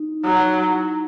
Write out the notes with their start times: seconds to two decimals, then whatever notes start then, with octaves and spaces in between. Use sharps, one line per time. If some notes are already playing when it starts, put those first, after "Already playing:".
Already playing: D#4
0.24 F#3 D#4
0.68 E4